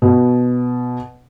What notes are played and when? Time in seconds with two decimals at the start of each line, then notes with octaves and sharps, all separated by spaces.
0.02 B2